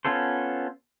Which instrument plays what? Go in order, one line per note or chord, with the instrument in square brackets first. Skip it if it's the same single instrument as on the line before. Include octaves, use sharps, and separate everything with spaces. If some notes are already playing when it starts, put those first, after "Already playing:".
[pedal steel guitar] B3 C#4 F4 A4 C5